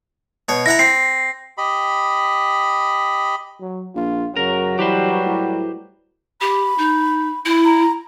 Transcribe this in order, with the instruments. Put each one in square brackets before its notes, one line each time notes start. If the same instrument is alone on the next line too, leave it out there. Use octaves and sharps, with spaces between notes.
[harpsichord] B2 C#5
[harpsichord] E4 F#5 A#5 [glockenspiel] A#6
[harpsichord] C4 [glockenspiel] C7
[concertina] G4 D#5 B5
[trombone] F#3
[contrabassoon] A#1 [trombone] F4
[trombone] F#2 [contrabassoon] C#3 [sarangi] F#3 [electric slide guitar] A#4
[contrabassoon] E3 [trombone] G3 [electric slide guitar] G4 B4 C5
[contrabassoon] A2
[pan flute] G4 [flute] B5
[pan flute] D#4
E4
[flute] A#5